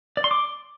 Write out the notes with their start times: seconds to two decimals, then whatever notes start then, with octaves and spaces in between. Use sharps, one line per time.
0.17 D5
0.24 C6
0.31 D6